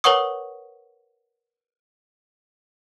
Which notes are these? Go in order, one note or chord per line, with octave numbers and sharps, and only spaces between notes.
A#4 B4 C#5 F#5 C#6 D#6